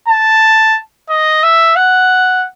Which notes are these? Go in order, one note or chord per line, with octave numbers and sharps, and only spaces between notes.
A5
D#5
E5
F#5